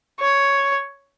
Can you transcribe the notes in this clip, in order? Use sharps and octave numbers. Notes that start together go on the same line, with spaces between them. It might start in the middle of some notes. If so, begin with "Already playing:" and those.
C#5